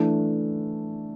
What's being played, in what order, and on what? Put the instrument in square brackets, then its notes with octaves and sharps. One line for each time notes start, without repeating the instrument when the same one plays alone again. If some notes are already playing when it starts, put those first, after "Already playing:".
Already playing: [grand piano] E3 A3 D4